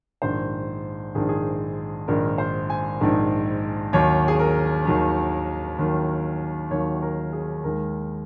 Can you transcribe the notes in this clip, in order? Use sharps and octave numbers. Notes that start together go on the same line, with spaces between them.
A#1 G#2 D#3 C5
A#1 G#2 D#3 G#4
G#4
A#1 G#2 D#3 A#4
C5
G#5
A#1 G#2 D#3
D#2 D#3 F#3 C#5
G#4
A#4
D#2 D#3 F#3
D#2 D#3 F#3
D#2 D#3 F#3 C#5
A#4
G#4
D#2 D#3 G#3 A#4